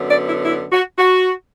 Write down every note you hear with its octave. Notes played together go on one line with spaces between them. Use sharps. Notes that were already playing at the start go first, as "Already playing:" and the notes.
Already playing: F#2 D3 B3
D5
E4
E4
F#4
F#4